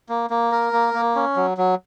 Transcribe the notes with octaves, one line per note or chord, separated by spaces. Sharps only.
A#3
A#3
A#4
A#3
A#3
C#4
F#3
F#3